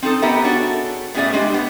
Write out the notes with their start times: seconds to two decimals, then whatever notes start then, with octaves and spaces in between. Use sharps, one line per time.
0.02 C4 D#4 G#4 A4
0.22 B3 D#4 G4 A#4 B4 E5
0.44 D4 F#4 G#4 A4 C#5
1.14 A2 B3 C#4 G#4 D5 E5
1.33 G#3 D4 G4
1.54 B3